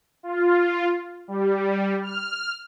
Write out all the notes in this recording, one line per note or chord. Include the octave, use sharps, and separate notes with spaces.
F4
G3
F6